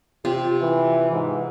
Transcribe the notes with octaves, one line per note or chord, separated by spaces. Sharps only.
C3 F4 G4
E3
G#2